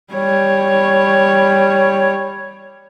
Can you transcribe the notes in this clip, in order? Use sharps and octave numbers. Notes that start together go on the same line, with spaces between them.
G3 C#5